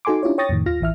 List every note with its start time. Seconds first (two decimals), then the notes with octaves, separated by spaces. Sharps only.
0.05 D#4 F#4 A4 G#5 C6 D6
0.23 C#4 D4 E4 F4 G4 C#5
0.38 C#5 G5 C#6 D#6 A6 A#6
0.49 F2 A2 D#3
0.66 D#2 F4 F6 A#6
0.81 A1 E3 E5 F6